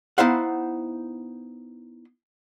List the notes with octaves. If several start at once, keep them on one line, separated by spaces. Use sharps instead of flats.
B3 D#4 E4 C5 F5 F#5